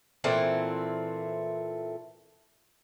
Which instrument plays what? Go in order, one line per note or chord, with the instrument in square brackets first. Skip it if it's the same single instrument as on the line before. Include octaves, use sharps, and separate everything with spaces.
[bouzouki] A#2 E3 A3 C4